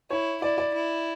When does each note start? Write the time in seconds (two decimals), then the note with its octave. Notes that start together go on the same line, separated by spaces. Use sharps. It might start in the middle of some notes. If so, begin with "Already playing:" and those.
0.10 E4 C#5
0.42 E4 D5
0.58 D5
0.74 E4